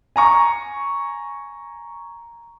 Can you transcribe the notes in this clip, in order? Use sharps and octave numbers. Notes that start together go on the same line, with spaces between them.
G#5 A#5 C#6